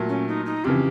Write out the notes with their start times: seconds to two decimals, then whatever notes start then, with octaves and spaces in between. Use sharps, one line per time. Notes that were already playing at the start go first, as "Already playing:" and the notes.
Already playing: A#2 F#3 A3
0.09 C#4
0.28 D#4
0.46 D#4
0.65 F2 C#3 E3 G4